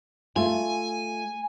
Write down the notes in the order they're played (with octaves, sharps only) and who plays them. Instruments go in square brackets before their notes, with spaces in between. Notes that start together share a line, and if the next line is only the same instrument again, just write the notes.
[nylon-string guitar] A3 F4 [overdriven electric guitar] G#5